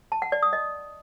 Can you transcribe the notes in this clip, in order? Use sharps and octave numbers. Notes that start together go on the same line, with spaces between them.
A5
F#5
D5
D#6
D#5